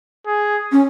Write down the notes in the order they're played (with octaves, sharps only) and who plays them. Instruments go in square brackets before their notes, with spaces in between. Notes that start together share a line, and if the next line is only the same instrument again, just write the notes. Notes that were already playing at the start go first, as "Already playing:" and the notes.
[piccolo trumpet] G#4
[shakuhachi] C#4